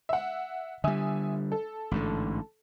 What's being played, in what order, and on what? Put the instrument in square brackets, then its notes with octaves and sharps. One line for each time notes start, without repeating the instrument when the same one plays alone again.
[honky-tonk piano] E5 F#5
[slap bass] D3 G3 [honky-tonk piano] E5 G#5 D#6
[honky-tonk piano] A4
[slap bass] A1 G#2 D3